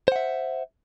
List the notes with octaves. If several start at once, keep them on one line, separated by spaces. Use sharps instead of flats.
C5 E5 F#5